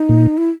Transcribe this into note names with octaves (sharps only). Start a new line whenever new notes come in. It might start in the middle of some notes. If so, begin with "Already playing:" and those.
Already playing: D#4
A#2
E4